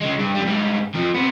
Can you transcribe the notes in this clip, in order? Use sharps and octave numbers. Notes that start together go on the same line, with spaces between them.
C#3 G#3
G2
F2 G3
G#2 G3
F2 F3
C3 B3